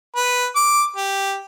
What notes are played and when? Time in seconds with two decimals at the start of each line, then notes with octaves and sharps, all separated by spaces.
0.16 B4
0.56 D6
0.96 G4